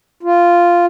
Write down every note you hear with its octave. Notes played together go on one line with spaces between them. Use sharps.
F4